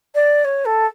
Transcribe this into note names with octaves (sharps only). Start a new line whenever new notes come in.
D5
C#5
A4